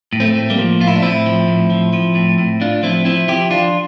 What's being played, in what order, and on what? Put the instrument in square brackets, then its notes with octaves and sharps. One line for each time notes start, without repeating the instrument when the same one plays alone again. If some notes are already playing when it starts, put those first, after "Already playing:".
[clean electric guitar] A2
A3 C4
A2
G3 A#3
F3
A2 F4
E4
D4
A2 C4 E4
F3
A2
F3
F3
A2
A2
A2 D4 F4
F3 C4 E4
F3 C4 E4
F3 E4 G4
F3 D4 F4